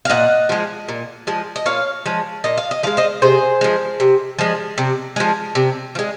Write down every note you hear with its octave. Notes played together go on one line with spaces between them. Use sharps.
F5
A#2 D#5 F#5
F3 G#3
A#2
F3 G#3
D#5
A#2 C#5 F5
F3 G#3
A#2 D#5
F5
D#5
F3 G#3 F5
C5 D#5
C3 G#4 C5
F3 G#3
C3
F3 G#3
C3
F3 G#3
C3
F3
G#3